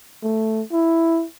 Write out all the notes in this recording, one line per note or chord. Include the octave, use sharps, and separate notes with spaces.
A3
E4